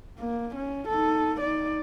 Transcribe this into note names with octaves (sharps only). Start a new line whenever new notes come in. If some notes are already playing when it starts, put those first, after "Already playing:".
A#3
C#4
D#4 A4
D#4 D5